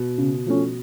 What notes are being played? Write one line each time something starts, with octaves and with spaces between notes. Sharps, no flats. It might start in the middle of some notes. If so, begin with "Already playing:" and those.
Already playing: B2
C#3
F3 A3 C#4